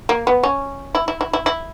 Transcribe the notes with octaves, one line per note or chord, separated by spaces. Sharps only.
A#3
B3
C#4
E4
E4
E4
E4
E4